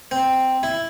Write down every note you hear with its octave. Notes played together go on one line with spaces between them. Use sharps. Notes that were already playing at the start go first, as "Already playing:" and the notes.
C4
E4